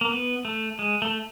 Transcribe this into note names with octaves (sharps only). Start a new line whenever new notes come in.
A#3
B3
A3
G#3
A3